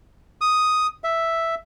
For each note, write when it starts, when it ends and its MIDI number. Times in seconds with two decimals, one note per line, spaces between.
0.41 0.87 87
1.04 1.55 76